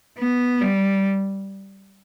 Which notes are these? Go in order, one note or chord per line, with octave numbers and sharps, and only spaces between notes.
B3
G3